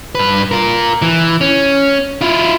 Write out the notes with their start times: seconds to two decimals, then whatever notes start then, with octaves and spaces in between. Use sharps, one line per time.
0.15 G2 B4
0.51 F4 A#4
1.02 E3
1.41 C#4
2.21 E4 F4